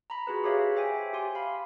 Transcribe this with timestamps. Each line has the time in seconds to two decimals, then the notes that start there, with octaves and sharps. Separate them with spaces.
0.10 A#5 B5
0.27 F4 F#4 G#4 B4
0.44 G4 G#4 C5 C#5 E5 F5
0.76 C5 E5 G5 G#5
1.13 G4 G#5 C6
1.35 F5 B5